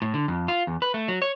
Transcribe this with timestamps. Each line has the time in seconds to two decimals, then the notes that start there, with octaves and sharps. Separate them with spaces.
0.02 A2
0.14 D3
0.28 F2
0.48 F4
0.67 E2
0.82 B4
0.94 A3
1.08 F#3
1.22 C#5